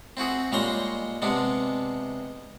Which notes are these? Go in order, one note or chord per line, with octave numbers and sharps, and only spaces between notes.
C4 E4 F#4 G#4
A#2 G3 G#3 C#5 A#5 C6
C3 G#3 B3 D4